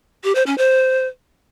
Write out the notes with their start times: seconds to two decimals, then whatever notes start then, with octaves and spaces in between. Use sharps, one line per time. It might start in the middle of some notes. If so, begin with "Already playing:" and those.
0.24 G4
0.35 C5
0.46 C#4
0.58 C5